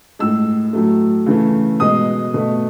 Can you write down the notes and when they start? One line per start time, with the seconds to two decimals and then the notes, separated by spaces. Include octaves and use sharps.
0.19 A2 G#3 E6
0.73 A2 F#3 A3
1.26 C#3 E3 A3
1.80 B2 G#3 D#6
2.34 B2 A3